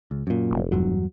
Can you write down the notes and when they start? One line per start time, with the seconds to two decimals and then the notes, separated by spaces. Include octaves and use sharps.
0.11 C#2
0.27 F#2 A#2
0.51 F1
0.72 E2 G2 F#3